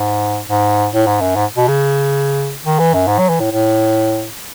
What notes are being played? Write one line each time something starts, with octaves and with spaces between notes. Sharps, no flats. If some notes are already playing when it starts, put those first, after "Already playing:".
Already playing: G#2
G#2
A2
G#2
F#2
G#2
B2
C#3
D#3
E3
F#2
G#2
F#3
E3
A2
A2